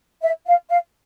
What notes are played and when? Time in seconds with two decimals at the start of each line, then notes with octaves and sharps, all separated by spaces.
0.22 E5
0.46 F5
0.69 F5